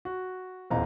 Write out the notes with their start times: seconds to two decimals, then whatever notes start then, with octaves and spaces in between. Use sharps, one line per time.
0.05 F#4
0.70 D#1 E2 C5 D#5 F5 A#5